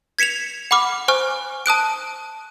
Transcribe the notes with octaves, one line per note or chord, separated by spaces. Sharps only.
G#6 B6 C#7 E7 F7
F#5 B5 D6 F6
C5 G#5 C#6 F6
A5 D#6 F#6 D7